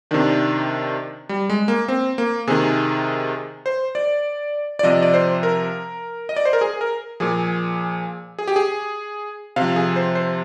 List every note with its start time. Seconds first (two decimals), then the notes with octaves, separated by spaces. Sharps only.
0.11 C3 D#3 D4
1.29 G3
1.50 G#3
1.68 A#3
1.88 C4
2.18 A#3
2.47 C3 D#3 G#4
3.66 C5
3.95 D5
4.79 D5
4.83 C3 F3 D#5
5.02 D5
5.14 C5
5.43 A#4
6.29 D#5
6.36 D5
6.45 C5
6.53 A#4
6.61 G#4
6.81 A#4
7.20 A#2 F3 G#4
8.39 G#4
8.48 G4
8.56 G#4
9.56 C3 F5
9.62 F3
9.76 G#4
9.96 C5
10.15 C5